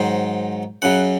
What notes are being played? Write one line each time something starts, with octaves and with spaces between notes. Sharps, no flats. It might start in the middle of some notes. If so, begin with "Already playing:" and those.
Already playing: G#2 D#3 F#3 C5
F#2 C#3 F#3 F#5